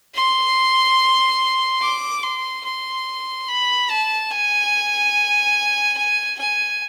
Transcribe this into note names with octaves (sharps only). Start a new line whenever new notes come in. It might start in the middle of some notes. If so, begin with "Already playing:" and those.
C6
D6
C6
C6
B5
A5
G#5
G#5
G#5